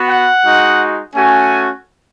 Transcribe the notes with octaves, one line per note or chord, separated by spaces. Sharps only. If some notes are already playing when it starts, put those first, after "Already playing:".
Already playing: B3 F#4
F#5
G#3 D#4 F#4
A3 C#4 F#4 G#5